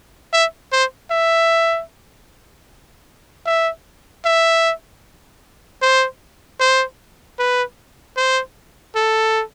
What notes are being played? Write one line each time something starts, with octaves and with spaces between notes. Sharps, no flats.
E5
C5
E5
E5
E5
C5
C5
B4
C5
A4